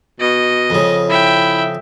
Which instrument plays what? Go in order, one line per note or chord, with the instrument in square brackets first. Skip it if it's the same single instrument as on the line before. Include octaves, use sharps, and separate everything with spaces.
[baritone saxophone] B2 [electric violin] D#5
[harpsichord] F2 C#3
[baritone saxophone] E4 [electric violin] E5 G5